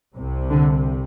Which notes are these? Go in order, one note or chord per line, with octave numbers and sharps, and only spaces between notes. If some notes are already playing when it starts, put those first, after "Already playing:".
C2 C3
D3